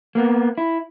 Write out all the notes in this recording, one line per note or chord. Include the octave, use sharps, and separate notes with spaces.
A#3 B3
E4